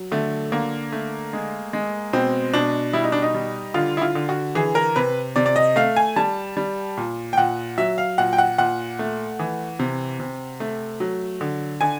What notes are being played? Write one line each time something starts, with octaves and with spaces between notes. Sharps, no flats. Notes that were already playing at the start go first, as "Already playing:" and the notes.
Already playing: F#3
D3 A3
D3 A#3
A3
G#3
G#3
B2 C4
B2 D4
G3 E4
D#4
D4
D#4
G3
D3 F4
E4
F4
D3
F#4
E3 G#4
A#4
C3 B4
C3 D5
D5
D#5
A3 F5
G#5
G3 A5
G3
A#2
G5
A#2 F#5
F#3 E5
F5
A#2 F#5
G5
F#5
A#2 F#5
A3
E3
C3
C3
A3
F#3
D3
D3 G#5